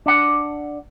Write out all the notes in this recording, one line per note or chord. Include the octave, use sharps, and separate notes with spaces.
D4 F#5